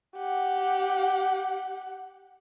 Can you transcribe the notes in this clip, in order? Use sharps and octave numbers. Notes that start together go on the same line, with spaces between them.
G4 F#5